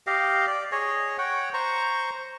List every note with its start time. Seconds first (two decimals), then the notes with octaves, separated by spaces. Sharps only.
0.07 G4 D#5 F5
0.47 D5
0.72 G#4 C#5 D#5
1.18 C#5 F#5 G5
1.54 C5 A#5 C#6